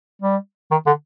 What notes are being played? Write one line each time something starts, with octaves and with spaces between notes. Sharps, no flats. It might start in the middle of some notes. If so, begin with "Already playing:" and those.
G3
D#3
D3